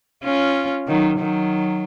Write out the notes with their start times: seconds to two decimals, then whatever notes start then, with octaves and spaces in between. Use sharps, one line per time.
0.23 C#4 F4
0.88 D#3 F#3
1.19 D#3 F#3